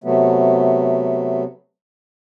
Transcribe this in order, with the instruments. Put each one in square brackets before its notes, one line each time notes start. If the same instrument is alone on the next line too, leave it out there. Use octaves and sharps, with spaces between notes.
[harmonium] C3 F#3 A3 B3